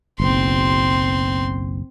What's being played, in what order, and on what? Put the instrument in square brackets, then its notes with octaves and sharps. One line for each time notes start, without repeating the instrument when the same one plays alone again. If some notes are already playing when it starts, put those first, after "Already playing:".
[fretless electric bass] F#1 B1 [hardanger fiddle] C4 C6